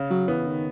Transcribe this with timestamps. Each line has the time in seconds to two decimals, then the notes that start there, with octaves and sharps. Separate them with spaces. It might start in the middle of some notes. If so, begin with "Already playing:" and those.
Already playing: C#3
0.10 F#3
0.28 E3 B3
0.47 D#3